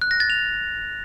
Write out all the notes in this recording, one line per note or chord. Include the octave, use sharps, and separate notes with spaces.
F#6
A#6
A6
F7